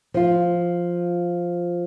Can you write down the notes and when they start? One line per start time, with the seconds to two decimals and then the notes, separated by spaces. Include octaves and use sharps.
0.14 F3 F4